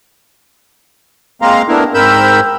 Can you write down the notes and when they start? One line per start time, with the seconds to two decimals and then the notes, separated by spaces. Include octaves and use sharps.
1.42 G#3 A#3 C4 F5 A#5 C6
1.68 A3 B3 D4 E4 A#4
1.94 G#2 C4 A#4 B5 E6 G6